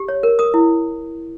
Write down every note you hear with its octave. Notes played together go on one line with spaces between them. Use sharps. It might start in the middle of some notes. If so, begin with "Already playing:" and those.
Already playing: G4
C#5
A#4
A#4 D#6
E4